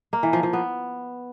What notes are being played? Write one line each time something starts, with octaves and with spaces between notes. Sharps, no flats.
A#3
E3
F3
F3
B3